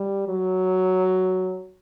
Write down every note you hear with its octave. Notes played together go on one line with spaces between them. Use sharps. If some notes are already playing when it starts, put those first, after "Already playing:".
Already playing: G3
F#3